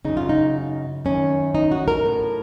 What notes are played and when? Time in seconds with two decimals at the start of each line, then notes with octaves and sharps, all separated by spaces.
0.05 F#2 C#3 D#4
0.17 F4
0.29 D#4
1.05 F#2 D#3 C#4
1.55 D#4
1.72 F#4
1.88 A#4
2.05 A2